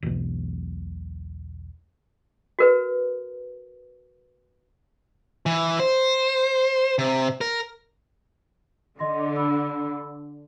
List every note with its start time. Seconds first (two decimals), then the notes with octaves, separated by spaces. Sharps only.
0.03 E1 B1
2.59 F#4 A#4 B4
5.46 E3
5.80 C5
6.98 C3
7.41 A#4
8.99 D3 D#5 C6 A#6
9.36 B5 E6